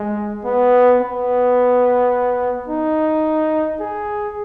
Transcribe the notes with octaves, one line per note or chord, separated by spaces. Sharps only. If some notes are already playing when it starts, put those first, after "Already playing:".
Already playing: G#3
B3
B3
D#4
G#4